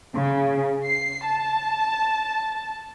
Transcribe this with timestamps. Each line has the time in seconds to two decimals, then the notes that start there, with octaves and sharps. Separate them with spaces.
0.13 C#3
0.86 C7
1.24 A5